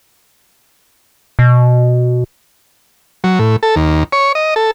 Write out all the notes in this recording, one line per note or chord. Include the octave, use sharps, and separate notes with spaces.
B2
F#3
A2
A4
D#2
C#5
D#5
A4